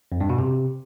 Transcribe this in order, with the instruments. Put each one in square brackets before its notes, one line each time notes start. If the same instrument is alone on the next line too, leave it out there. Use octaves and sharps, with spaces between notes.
[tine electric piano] F2
G2
B2
C3